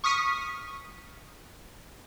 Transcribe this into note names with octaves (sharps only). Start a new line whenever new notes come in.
C#6 D#6 F6 B6 C#7 D#7